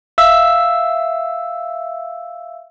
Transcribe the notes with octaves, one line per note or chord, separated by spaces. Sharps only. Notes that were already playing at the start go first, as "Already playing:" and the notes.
E5 F5 E6